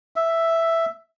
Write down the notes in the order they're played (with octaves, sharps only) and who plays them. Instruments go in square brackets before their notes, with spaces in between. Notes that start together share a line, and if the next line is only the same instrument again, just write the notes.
[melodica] E5